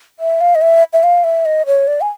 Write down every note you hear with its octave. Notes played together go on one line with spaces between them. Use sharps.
E5
F5
D#5
E5
E5
F5
E5
D#5
C#5
D5
G#5